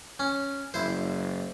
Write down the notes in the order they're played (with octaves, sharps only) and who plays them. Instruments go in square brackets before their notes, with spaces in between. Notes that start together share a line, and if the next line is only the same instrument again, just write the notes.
[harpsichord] C#4
[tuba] F#1 [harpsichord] E4 C5